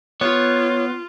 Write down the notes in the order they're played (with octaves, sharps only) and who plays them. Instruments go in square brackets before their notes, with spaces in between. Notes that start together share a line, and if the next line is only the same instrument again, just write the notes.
[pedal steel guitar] B3 [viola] F4 [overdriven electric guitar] C#5